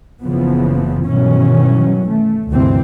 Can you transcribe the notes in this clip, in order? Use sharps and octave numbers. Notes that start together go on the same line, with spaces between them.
F#1 C#3 E3 F3 B3
G2 B2 D#3 E3 F#3 C#4
A3
D2 G2 C3 E3 C4